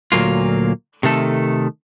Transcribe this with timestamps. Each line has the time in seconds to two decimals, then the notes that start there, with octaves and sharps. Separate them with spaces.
0.12 D2 A#2 F#3 A#3 F4
1.03 C3 D#3 A3 A4